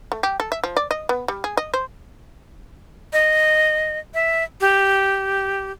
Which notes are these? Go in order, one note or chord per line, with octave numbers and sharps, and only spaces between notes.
A3
G4
A4
E5
F3
D5
D#5
B3
G3
G#4
D#5
C5
D#5
E5
G4